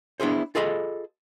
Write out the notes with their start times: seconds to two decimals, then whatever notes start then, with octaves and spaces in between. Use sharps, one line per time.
0.20 B3 D4 E4 G#4 C5
0.55 F4 G#4 A4 D#5 B5